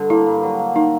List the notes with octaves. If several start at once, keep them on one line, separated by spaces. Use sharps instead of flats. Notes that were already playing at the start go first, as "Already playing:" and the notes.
Already playing: G2 D3
A#3 E4
G2
F#3
A#3
A#3 D#4